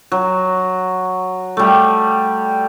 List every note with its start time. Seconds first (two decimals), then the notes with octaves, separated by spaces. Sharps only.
0.12 F#3
1.57 G3 A3